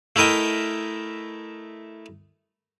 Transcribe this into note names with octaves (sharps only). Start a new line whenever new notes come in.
A3 E4 A#4 D#5 G5